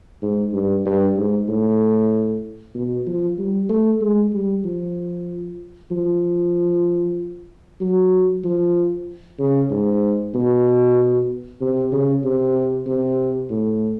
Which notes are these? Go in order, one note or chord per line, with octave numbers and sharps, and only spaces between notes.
G#2
G2
G2
G#2
A2
B2
F3
G3
A3
G#3
G3
F3
F3
F#3
F3
C#3
G#2
B2
C3
C#3
C3
C3
A2